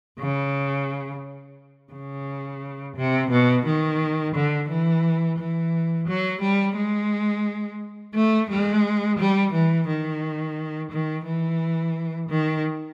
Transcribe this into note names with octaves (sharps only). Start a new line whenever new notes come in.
C#3
C#3
C3
B2
D#3
D3
E3
E3
F#3
G3
G#3
A3
G#3
G3
E3
D#3
D#3
E3
D#3